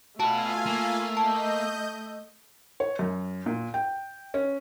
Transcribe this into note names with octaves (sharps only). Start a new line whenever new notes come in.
A3 F4 F#4 B4 F5 G#5 A5
A#3
D#5 A5 G6
C#5
F#2
A#2
G5
C#4